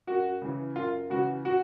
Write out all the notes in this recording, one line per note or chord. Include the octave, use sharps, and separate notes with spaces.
F#2 F#4
C#3 E3
F#2 F4
C#3 E3 F#4
F#4